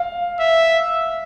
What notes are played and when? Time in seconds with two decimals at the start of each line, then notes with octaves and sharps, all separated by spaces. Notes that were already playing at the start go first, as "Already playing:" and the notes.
Already playing: F5
0.40 E5